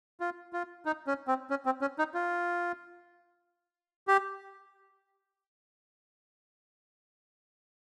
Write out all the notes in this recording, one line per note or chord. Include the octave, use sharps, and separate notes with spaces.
F4
F4
D#4
C#4
C4
C#4
C4
C#4
D#4
F4
G4